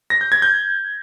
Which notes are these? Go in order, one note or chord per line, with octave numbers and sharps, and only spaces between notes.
A#6
G6
G#6
G6